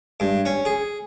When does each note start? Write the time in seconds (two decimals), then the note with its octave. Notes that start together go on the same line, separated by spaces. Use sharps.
0.20 G2
0.45 C#4
0.65 G#4